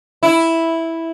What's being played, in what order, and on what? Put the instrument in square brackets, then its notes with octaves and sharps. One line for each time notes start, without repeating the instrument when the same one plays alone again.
[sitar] E4